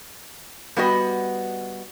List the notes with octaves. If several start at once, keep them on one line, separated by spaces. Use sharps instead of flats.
G3 B3 F#4 D#5